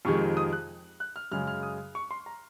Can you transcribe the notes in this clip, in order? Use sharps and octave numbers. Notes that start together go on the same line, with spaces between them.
F2 C3 D#3 G#3 C#6
D#6
F#6
F#6
F6
F#2 C#3 G#3 F6
F6
D#6
C#6
C6
A#5